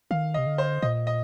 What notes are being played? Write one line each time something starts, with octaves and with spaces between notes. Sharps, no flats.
D#3 F5
D#5
C3
D3
C5
A#2 D#5
D#5